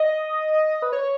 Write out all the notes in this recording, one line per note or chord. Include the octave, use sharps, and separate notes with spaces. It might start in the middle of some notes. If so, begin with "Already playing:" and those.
Already playing: D#5
B4
C#5